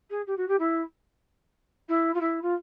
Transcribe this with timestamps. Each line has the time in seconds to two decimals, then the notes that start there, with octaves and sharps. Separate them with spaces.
0.10 G#4
0.27 G4
0.37 F#4
0.48 G4
0.59 E4
1.89 E4
2.14 F4
2.20 E4
2.42 F4